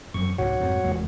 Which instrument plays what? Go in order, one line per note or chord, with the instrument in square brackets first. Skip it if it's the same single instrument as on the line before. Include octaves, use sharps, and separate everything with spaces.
[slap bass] F#2 F3 [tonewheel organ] C#6
[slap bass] C2 G#2 C3 [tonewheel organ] F#4 C#5 F#5
[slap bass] F2 G#2 C3
F1 E2 G#3